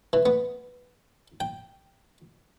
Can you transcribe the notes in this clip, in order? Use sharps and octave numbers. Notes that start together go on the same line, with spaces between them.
E3
B3
G5